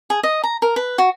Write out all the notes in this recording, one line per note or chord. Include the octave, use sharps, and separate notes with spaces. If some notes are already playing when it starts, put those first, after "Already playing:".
G#4
D#5
A#5
A#4
B4
F#4